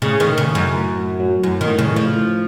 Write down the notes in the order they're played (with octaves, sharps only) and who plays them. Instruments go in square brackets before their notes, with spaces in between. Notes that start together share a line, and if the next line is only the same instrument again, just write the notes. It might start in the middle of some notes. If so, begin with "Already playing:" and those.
[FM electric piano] A2 [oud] C#3
[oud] D#3
[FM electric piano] A3
[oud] C#3
[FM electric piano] A2
[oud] F#2
[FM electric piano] A2
A2
F#3
[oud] F#2 [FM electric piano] A2
[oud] D#3
[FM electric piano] A2
[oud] C#3
[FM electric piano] A2
[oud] F3
[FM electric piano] A2